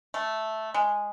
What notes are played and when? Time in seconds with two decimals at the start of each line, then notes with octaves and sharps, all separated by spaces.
0.14 A3
0.74 G#3